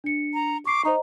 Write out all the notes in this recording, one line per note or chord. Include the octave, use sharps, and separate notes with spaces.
D4 C#7
A#5
C#6 D6 C7
D#4 C5 D#5 A#5